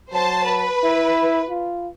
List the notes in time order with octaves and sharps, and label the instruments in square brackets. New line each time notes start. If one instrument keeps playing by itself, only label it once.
[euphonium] F#3 [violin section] C5 A5
[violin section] B4
[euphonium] E4
F4